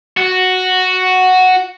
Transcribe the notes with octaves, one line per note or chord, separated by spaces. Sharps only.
F#4